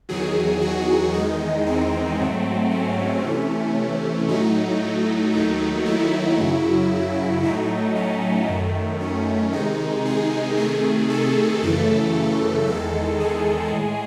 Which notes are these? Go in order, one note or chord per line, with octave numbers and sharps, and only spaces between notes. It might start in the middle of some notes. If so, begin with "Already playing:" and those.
E2 D#3 F#3 G#4
F#4
E2 D#3 G#3 D#4
C4
G#2 F#3 A3
C#4
C3 E3 A3
A2 F#3 A3 D#4
D#2 D#3 F#3 A3
E4
F#2 C#3 F#3
A2 F#3 A3 D#4
C#4
F#2 D#3 A3
C#4
C3 D#3 G#3 D#4
G#4
C3 D#3 A3 G#4
A4
F#2 C#3 E3 A3 A4
E2 D#3 G#3 A4
G#4
A2 G#3